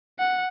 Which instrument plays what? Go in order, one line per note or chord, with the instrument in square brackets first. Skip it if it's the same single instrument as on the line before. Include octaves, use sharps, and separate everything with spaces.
[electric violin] F#5